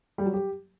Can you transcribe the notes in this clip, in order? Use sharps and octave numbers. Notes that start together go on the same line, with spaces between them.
G3
F#3
G4